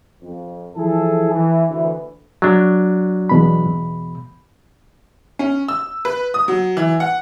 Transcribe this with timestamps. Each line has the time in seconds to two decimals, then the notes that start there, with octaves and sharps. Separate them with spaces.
0.22 F2
0.76 E3 F3 E4 G#4 A4
1.32 E3
1.69 D2 E3
2.42 F#3 D4
3.29 E2 B2 B5
5.39 C#4
5.68 E6
6.05 B4
6.34 D#6
6.48 F#3
6.77 E3
7.00 F#5